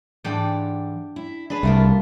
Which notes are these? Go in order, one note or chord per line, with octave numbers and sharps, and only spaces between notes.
G#2 E3 D4 G4 D5
E4
D4 G#4 B4 B5
C2 G3 A3 A#3 F4